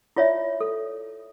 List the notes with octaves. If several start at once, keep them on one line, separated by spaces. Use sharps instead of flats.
E4 F4 C#5 D5 E5
A4